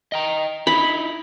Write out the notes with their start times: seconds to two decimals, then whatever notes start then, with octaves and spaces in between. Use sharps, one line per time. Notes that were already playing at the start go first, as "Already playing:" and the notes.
0.12 D#5 G5 A#5
0.67 D#4 E4 B5